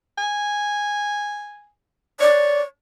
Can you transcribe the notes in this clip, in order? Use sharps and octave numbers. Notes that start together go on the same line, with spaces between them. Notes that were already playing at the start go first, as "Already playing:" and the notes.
G#5
C#5 D5